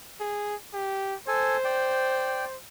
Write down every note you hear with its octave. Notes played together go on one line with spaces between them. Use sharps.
G#4
G4
A4 C5 G#5
D5 G5